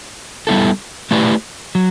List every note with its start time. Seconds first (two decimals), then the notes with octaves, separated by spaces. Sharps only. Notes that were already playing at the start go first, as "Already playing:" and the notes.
0.47 G3 B3 E4 A4
1.11 A3 E4 G4 B4 D5
1.75 F#3